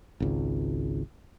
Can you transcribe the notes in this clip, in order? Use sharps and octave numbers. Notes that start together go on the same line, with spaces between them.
G#1 C#2